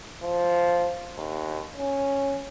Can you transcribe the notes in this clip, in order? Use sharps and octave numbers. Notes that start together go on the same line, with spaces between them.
F3
D#2
C#4